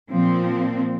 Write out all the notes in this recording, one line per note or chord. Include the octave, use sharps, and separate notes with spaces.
A#2 F3 C4